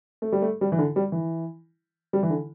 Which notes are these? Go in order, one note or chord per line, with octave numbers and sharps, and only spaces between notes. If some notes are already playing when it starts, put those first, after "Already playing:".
A3
G3
A3
G3
E3
D3
G3
E3
G3
E3
D3